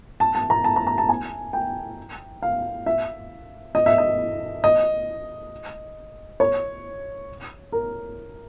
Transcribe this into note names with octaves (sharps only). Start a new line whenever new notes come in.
A5
A5
A#5
A5
A#5
A#5
A5
G#5
G5
F5
E5
D#5
E5
D#5
D#5
C#5
A#4